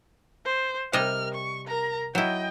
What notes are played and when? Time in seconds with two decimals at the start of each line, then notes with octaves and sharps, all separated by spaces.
0.45 C5
0.93 C3 G3 A#4 D#5 F6
1.34 C#6
1.68 A#4 A#5
2.15 F#3 E4 D#5 G5